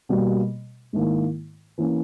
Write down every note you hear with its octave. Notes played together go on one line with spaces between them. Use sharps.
B2 G3 A#3
G#2 D#3 A#3 E4
E3 A#3 C#4